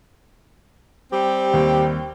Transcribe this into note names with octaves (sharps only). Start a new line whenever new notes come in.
G3 C4 G4
D#2